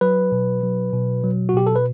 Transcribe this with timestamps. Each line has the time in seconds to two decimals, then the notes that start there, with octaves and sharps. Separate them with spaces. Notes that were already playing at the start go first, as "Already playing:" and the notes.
0.01 F#3 B4
0.32 B2
0.63 F#3
0.93 B2
1.24 F#3
1.49 F#4
1.54 B2 G4
1.67 A4
1.76 B4